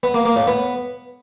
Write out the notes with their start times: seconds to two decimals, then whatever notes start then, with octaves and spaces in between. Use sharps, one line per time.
0.03 B3
0.14 A#3
0.25 A#3
0.36 A2
0.47 B3